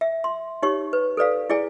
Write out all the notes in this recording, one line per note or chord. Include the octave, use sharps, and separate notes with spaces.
E5
C6
D#4 G4 C#5 C#6
B4
A4 B4 D5 F5
E4 G#4 D5 G#5